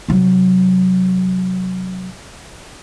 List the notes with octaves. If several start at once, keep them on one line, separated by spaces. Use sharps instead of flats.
C3 F#3